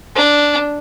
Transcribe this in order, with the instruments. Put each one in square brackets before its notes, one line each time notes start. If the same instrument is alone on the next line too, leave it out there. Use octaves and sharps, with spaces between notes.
[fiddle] D4